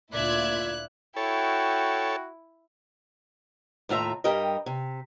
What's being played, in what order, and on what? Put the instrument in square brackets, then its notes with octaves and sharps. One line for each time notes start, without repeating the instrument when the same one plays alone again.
[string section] D2 E5 G#6 [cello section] A#2 F4 [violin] E4 F#6 [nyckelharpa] D5
[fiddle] E4 [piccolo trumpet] F#4 [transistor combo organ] A4 C#5 [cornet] G5
[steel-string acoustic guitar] D#2 A2 F4 E5 A#5
G2 G3 G4 A#4 D#5
C3